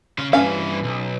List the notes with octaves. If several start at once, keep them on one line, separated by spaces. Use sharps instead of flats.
C#3 F5
G2 E3 C#4 F5
B1